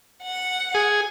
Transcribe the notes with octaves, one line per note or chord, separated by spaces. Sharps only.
F#5
G#4